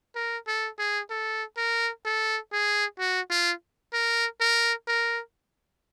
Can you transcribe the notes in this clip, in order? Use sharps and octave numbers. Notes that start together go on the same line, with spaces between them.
A#4
A4
G#4
A4
A#4
A4
G#4
F#4
F4
A#4
A#4
A#4